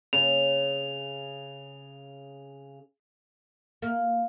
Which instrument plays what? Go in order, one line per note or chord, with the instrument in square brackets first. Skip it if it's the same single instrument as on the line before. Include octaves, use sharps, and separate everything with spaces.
[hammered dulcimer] C#3 [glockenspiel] F7
[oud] A#3